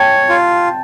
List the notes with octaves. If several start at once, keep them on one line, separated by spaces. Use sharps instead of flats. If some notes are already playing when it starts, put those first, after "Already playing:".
Already playing: C#5 G5 A5
F4